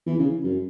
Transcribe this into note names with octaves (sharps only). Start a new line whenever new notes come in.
E3
C#3
F#2